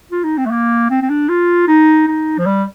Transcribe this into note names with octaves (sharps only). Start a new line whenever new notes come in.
F4
D#4
C4
A3
A#3
C4
C4
D4
F4
D#4
D#4
F3
G3